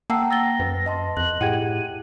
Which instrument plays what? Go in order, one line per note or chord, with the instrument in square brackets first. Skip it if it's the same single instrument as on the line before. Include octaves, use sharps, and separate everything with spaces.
[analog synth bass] A#3 [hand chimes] F#5 G5 A#5 [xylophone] A5 E6 C7
[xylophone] E6 A6 G7 [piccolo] A#6
[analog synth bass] F#2 [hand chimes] B4
[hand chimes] D#5 A5 C6
[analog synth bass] F2 [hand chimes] F#6 [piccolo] F#7
[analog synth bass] A2 [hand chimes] E4 G4 G#4 [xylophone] F#5 G5 G#6 [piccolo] D#7